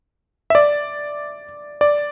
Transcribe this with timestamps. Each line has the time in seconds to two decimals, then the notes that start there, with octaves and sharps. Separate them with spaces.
0.50 E5
0.55 D5
1.81 D5